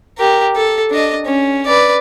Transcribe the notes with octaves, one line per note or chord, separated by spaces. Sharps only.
G4 A#4
A4
D4 D#5
C#4
B4 D5